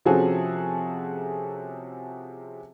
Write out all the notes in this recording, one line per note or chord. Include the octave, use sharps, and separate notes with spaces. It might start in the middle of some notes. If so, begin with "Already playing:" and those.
C3 F3 C#4 F#4 G#4 A4